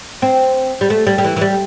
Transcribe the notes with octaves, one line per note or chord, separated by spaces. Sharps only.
C4
G3
A3
G3
G3
E3
E3
G3